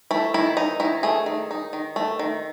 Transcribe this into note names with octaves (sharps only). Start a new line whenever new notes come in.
A3 E4
D#3 E4
D#4
D#3 E4
A3 G#4
D#3
D#4
D#3
A3
D#3